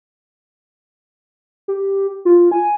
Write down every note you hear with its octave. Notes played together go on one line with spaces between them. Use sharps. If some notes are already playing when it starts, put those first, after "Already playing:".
G4
F4
G#5